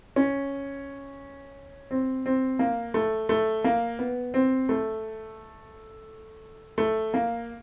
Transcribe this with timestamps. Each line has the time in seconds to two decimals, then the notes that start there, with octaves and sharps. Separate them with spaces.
0.16 C#4
1.91 C4
2.26 C4
2.59 A#3
2.94 A3
3.29 A3
3.64 A#3
3.99 B3
4.34 C4
4.69 A3
6.78 A3
7.14 A#3